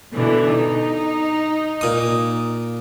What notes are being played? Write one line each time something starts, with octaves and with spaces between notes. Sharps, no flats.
B2 D3 E3
D#4
A#2 D#6